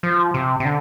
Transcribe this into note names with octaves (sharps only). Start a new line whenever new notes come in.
F3
C3
C3
D3